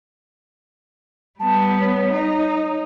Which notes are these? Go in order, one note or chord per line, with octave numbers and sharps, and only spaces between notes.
G3 B3 A5
C#5
D#4